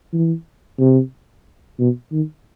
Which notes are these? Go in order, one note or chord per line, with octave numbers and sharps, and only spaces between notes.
E3
C3
B2
D#3